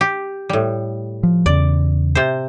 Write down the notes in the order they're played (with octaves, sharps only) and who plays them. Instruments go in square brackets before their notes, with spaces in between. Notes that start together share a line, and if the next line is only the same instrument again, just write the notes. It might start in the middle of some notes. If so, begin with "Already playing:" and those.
[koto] G4
A2 G3
[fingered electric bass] F3
[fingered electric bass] E2 C#3 [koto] D5
[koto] C3 C5